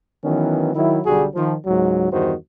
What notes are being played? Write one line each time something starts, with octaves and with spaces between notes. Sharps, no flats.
D#3 E3 F#3 B3 C#4
D#3 F#3 E4
B1 D3 G3 F#4 G#4
D#3 F3
C#2 G#2 F#3
E2 G2 D#3 F#4 C5